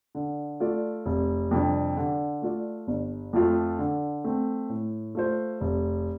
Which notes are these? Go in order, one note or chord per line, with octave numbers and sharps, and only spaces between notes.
D3
A3 F4 A4 D5
F1
F2 C3 G3 D4
D3
A3 F4 D5
G1
F2 F3 A3 F4
D3
A3 C4
A2
A3 F4 C5
F1